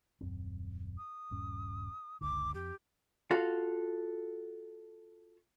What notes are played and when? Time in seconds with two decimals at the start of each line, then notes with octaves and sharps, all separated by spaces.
0.21 D#1 F#2 C4
0.97 D#6
1.31 D#1 G2 C#4
2.21 F#1 C#2 D3 D6
2.54 F2 G4
3.31 F4 F#4 A4 F5